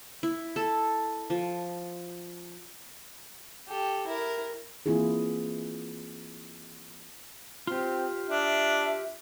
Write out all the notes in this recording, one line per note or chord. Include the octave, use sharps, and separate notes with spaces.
E4
A4
F3
G4 A4
E4 A#4
E3 A#3 C4 E4 F4 G#4
C4 F4 G4
D4 E5